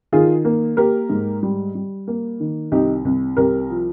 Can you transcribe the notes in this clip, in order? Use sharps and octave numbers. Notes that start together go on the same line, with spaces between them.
D#3 F4 G#4
A#3
A#3 G4 A#4
G#2
G3
G3
A#3
D#3
C2 D#4 G4
C2
C2 G4 A#4
F3